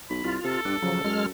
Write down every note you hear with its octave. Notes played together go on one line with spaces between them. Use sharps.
B1 B5
C2 F4
C3 A4
G2 D4
C#3 F3 F#3
F#2 G#3 F6